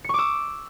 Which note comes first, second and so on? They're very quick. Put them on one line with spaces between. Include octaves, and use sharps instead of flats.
C#7 C#6 D6 E6